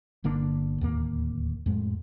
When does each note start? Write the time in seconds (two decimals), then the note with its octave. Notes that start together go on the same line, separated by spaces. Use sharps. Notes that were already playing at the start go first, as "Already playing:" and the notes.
0.24 G1 D3 A#3 D4
0.81 D1 D#2 A#3
1.66 F2 A2 G#3